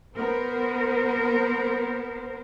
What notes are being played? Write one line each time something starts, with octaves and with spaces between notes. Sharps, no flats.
B3 A#4 C5